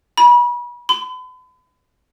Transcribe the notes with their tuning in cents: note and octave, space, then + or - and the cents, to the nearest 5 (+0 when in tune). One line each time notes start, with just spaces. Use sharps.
B5 -35
B5 +40